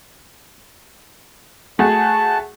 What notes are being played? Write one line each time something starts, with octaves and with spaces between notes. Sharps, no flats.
A3 F#4 G#4 A5